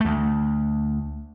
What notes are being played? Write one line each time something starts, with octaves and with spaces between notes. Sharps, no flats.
D2 A3